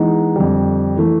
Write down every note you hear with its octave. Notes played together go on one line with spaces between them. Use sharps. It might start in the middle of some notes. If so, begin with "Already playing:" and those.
Already playing: E3 G#3 B3 D#4
F2 D3 G3
E3 A3